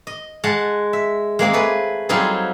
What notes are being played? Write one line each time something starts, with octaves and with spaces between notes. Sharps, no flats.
D#5
G#3 F#5 A5
E5
G#3 A#3 C4 G#4
A3 G#4 B4
F#3 G3 C4 D#4 F4 G#4